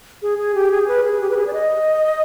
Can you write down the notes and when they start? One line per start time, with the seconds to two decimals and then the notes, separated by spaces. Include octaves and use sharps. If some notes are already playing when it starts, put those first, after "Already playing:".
0.22 G#4
0.38 G#4
0.55 G4
0.71 G#4
0.88 B4
1.04 G#4
1.21 G4
1.30 B4
1.37 G#4
1.47 D5
1.53 D#5